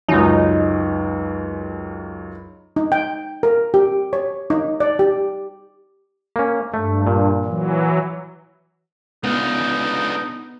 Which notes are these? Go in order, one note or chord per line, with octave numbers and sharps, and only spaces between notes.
C#2 F#2 D#4
D#4
G5
A#4
G4
C#5
D#4
D5
G4
A#3 C#4
G2 A3
A#2
E3 F#3
C#2 D3 B3 D#4